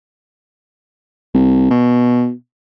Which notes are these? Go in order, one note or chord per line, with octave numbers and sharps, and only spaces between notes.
C2
B2